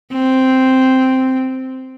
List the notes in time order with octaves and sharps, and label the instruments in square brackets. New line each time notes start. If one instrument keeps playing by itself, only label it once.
[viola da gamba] C4